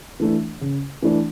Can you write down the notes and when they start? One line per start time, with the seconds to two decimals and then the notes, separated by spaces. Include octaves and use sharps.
0.20 E3 A3 D4
0.61 C#3
1.02 E3 A3 D4